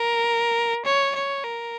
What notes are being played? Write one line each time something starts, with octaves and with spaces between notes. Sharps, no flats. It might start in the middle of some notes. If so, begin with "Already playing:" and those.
Already playing: A#4
C#5
C#5
A#4